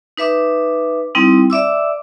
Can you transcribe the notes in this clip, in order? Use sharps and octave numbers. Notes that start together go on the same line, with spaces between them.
D#4 B4 E5 D6
G3 C4 D#4 E4
D5 E5 D6 E6